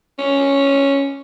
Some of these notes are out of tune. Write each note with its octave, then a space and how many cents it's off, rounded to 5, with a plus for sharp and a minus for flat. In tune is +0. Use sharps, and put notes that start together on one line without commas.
C#4 +0